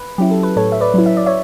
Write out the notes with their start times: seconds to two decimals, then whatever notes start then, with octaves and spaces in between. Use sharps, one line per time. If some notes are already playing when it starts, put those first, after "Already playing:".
Already playing: B4
0.18 F#3 C#4 E4 G4
0.31 A4
0.43 B4
0.56 A2 A4 C#5
0.72 E5
0.81 B4 D5
0.94 F#3 C#4 E4
1.06 E5
1.17 D5
1.26 C#5 E5